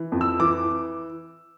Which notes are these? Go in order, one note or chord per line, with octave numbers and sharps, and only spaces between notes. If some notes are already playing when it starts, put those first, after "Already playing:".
Already playing: E3
F2
E6
E3 D6